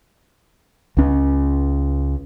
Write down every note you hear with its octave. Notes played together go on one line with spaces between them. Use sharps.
C#2 C#4